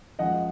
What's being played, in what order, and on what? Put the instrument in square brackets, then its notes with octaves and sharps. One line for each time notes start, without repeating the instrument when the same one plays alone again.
[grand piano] F#2 F3 G#3 D#5 F#5